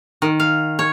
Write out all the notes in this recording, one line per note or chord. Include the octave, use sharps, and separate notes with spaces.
D#3
F5
C#5